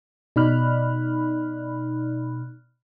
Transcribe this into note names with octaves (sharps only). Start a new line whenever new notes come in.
B2 D#4 D5 B5 F6 F#6